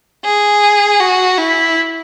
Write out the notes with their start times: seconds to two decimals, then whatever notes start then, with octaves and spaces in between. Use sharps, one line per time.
0.24 G#4
1.00 F#4
1.38 E4